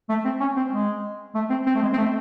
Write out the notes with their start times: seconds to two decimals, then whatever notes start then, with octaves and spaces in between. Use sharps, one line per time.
0.09 A3
0.25 C4
0.40 C#4
0.56 C4
0.72 G#3
1.35 A3
1.50 C4
1.66 C4
1.75 A3
1.82 G#3
1.93 C4
1.98 A3